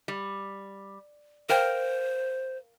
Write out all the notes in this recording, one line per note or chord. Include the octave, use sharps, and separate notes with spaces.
G3
A#4 C5 F5 G5